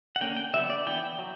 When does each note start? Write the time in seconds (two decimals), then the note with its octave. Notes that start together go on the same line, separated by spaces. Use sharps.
0.16 F#5
0.21 D3 A#3 C#4 G5
0.37 G5
0.54 D3 F#3 B3 E5
0.70 D5
0.86 E3 B3 G5
1.19 F#3